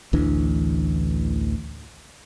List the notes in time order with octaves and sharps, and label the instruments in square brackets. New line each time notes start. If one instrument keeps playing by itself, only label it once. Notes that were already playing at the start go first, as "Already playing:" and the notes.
[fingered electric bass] A1 D2 E3 D4